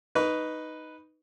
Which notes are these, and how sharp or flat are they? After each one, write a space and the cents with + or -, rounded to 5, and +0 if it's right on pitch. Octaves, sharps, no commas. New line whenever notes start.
D#4 +0 B4 +0 C#6 +35